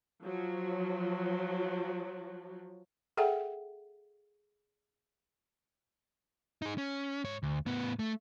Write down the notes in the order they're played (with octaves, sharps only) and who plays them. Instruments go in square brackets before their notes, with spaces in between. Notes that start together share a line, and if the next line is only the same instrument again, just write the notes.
[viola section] F3 F#3
[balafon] G#4 A4 E5 F#5 G5
[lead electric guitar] D#4 G#4
C#4
G#2 C#5
D2
A2 B3
A3